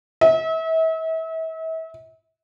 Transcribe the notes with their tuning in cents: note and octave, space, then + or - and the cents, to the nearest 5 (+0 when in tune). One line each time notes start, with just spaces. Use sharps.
E5 -35